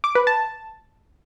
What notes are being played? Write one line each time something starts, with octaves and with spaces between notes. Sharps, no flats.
D6
B4
A5